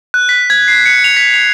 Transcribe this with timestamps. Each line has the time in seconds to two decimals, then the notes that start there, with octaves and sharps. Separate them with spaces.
0.14 F#6
0.29 B6
0.50 G#6
0.68 C7
0.86 C#7
1.04 F7
1.17 B6
1.34 F7